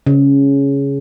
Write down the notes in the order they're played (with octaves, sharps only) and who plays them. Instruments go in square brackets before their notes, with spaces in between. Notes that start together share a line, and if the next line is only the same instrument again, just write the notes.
[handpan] C#3